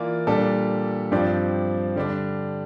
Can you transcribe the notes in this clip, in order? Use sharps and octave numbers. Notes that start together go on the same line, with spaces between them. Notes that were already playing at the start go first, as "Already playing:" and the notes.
Already playing: E3 A#3 F4 A#4 D5
A#2 G3 D4 A4
G2 F3 C4 G4 D5
D3 G3 D4